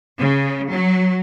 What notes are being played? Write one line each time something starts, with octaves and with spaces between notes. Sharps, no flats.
C#3
F#3